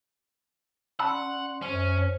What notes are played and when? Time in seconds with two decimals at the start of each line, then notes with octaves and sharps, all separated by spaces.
1.00 C#4 D5 F#5 A5 B5 C6 E6
1.62 F#2 C#4 C5 C#5